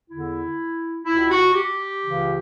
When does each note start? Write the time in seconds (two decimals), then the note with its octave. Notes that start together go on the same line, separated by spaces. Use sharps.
0.09 E2 D3 E4
1.05 C#2 B2 E4
1.30 F#4
1.54 G4
2.02 C#2 C#3 E3